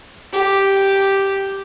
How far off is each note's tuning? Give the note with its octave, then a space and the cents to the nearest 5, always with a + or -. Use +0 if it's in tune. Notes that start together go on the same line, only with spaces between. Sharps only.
G4 -5